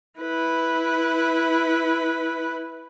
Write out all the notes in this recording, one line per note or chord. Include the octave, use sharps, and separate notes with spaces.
E4 B4